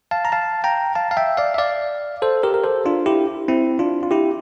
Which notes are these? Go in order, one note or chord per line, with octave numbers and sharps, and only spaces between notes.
F5 A5
A#5
F5 A5
G5 A#5
F5 A5
F5
E5 G5
D5 F5
E5
D5 F5
A4 C5
G4 A#4
A#4
A4 C5
D4 F4
E4 G4
C4 E4
D4 F4
F4
E4 G4